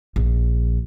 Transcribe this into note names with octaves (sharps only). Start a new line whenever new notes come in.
A#1